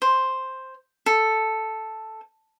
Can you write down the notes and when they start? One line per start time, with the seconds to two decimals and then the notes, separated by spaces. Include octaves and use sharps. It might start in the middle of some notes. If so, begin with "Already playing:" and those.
0.02 C5
1.06 A4